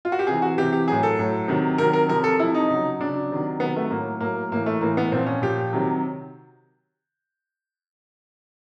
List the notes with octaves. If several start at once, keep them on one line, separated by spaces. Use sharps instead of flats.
F4
F#4
G4
C3 E3 G#4
F#4
C3 E3 G4
G4
A2 F#3 G#4
A4
A2 F#3
C3 D#3 F#3
C3 D#3 F#3 A#4
A#4
C3 F3 A#4
A4
C3 F3 E4
D#4
C#3 F#3
C#3 F#3 D4
C3 D#3 F#3
C3 D#3 F#3 B3
A3
A2 F#3 A#3
A2 F#3 A#3
A2 E3 A#3
A3
A2 E3 A#3
B3
A#2 F3 C4
C#4
A#2 F3 G4
C3 D#3 F#3